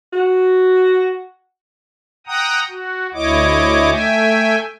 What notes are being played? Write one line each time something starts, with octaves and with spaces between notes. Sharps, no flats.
F#4
F#5 G5 A#5 D#6
F#4
D2 E4 C#5 D#5 D6
A3 E5 G5 G#5